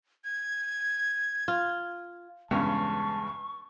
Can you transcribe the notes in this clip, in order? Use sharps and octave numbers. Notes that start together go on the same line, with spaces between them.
G#6
F4
E2 G2 C#3 G#3 C#4 A5 C#6